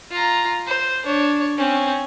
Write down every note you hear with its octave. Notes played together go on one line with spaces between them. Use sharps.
F4 A#5
C5
D4 C#5
C4 C#4